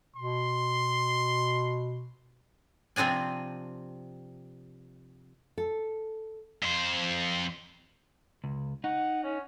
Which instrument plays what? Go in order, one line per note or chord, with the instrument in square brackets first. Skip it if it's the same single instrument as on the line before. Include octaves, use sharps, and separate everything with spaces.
[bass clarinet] B2 [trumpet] C6
[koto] C3 F3 C4 D4 G#5
[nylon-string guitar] A4
[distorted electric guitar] F2 C5
[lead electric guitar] C#2
[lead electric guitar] D#4 [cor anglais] F#5
[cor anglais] C#4